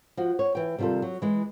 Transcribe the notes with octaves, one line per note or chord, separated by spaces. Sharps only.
F3 F#4
C#5
E3 G5
C3 D#3 G3 F4 A4
F#3
E3 G#3